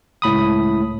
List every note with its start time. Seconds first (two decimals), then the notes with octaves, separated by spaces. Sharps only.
0.22 C#2 A2 B5 D#6